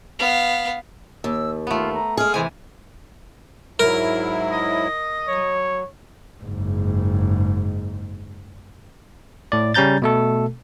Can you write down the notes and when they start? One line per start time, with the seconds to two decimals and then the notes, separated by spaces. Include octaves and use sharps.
0.19 B3 F5
1.24 D#2 E6
1.67 A3 B3 F4
1.93 A#5
2.17 G#3 G#4 F6
2.34 C3 E3 C5 G#5
3.80 G#2 F#3 E4 A#4
4.51 D#5
5.28 F#3 C#5
6.40 F#1 G#2
9.52 A2 D5
9.74 C#3 G3 C#4 A#5 G6 A6
10.02 B2 A3 A4